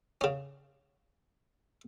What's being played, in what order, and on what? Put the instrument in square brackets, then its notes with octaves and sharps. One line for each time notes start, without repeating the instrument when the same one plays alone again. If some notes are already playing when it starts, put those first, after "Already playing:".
[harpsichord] C#3 C#4